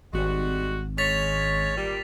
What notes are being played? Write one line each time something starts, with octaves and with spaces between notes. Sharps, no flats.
G#1 G3 G#3 F#4
G#3 C#4 C#5 A6 B6 F7
A#2 G3